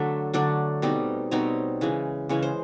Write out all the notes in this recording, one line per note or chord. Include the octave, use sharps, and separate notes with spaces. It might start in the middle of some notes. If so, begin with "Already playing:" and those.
Already playing: D3 F#3 A3 D4 E5
D3 F#3 A3 D4 D5
B2 G3 C4 D#4
B2 G3 C4 D#4 C#5
C#3 E3 G#3
C#3 E3 G#3 C#5
C5